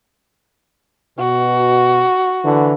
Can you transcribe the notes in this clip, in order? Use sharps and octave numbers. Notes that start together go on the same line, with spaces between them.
B2 F#4
D3 E3